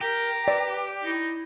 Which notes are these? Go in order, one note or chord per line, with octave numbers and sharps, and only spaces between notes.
G4 A#4 A#5
B4 D5
D#4 E4